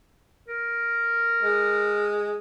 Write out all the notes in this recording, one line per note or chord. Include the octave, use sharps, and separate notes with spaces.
A#4
G#3